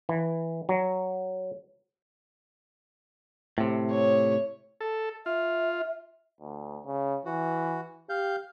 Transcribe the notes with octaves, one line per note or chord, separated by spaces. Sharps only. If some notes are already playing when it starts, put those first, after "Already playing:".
E3
F#3
A2 C3
C#5
A4
F4 E5
D2
C#3
E3 F#4
G4 F5 G6